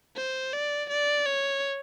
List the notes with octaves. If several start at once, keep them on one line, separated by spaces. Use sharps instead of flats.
C5
D5
D5
C#5